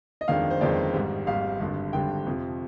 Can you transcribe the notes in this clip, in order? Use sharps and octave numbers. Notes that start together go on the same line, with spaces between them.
D#5
G1 F2 D#3 G#3 D4 F5
C5
G1 F2 D#3 G#3 D4 D5
G#1 G#2 G3
G#1 G#2 G3 F5
G#1 G2 D3
G#1 G2 D3 G5
F2 C3 F3